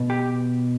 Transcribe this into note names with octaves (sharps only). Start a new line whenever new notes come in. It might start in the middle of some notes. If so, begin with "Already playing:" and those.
Already playing: B2
G4